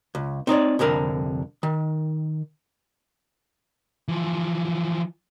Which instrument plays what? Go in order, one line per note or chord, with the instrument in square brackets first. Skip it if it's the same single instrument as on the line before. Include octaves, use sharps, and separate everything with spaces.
[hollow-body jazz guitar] C#2
C4 D#4 C#5 D5
C2 F2 D3 A#4 B5
D#3
[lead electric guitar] E3 F3